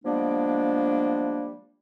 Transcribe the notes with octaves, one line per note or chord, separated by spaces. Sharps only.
F3 G3 G#3 A#3 B3 D4